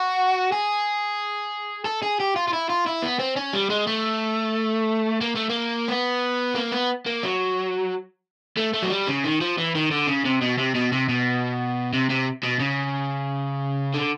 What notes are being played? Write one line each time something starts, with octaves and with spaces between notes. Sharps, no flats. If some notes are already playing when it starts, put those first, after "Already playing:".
Already playing: F#4
G#4
A4
G#4
G4
F4
F4
E4
F4
E4
B3
C4
C#4
G3
G#3
A3
A#3
A3
A#3
B3
A#3
B3
A#3
F#3
A3
A3
F#3
G3
C#3
D#3
F3
E3
D#3
D3
C#3
C3
B2
C3
B2
C3
B2
C3
C3
B2
C#3
D3